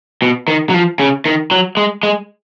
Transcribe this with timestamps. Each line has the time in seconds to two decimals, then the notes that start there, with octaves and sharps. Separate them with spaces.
0.22 B2
0.48 D#3
0.70 F#3
0.74 F3
0.99 C#3
1.26 D#3
1.51 F#3
1.77 G#3
2.03 G#3